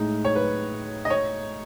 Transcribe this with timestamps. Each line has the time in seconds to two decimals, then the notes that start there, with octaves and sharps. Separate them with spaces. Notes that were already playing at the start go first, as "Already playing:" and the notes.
Already playing: A2 G#3 D#4
0.25 C#5
0.35 B4
1.05 D#5
1.10 C#5